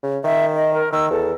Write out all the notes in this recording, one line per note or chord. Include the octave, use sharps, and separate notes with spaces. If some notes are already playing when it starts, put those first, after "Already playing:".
C#3
D#3 E5
D#5
A#4
D#3 E6
E2 A4